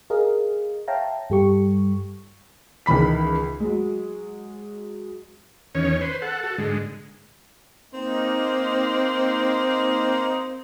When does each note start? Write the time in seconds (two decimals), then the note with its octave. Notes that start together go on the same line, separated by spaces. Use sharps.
0.10 G#4 A#4 D#5 F5
0.88 C#5 E5 F5 G5 A5 A#5
1.30 G2 G3 G4 A4 C#6
2.86 C#2 D#3 E3 B5 B6
3.60 F#3 G#3
5.75 E2 D#3 C#4 C#5
6.01 B4 C5
6.22 A4 F#5
6.43 F#4 A4
6.58 G#2 D3 G#3
7.94 A#3 C4 D#4